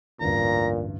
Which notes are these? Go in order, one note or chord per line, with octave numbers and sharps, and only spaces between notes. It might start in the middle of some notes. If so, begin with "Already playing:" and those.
A1 D2 G2 A#2 A#5